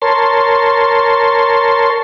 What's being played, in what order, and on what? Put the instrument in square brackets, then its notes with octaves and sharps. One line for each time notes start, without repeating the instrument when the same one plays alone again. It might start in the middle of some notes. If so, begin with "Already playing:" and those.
[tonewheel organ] A#4 C#5 A5 C6